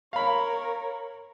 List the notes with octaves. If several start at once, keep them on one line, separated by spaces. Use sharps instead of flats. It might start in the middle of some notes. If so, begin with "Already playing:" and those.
A#4 C#5 F5 B5